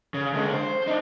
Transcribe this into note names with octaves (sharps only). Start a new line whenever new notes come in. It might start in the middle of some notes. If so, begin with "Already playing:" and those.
C#3
D3 G#3
C5
D4 D#4